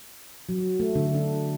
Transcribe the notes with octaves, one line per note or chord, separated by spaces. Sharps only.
F#3
A3
D3
D4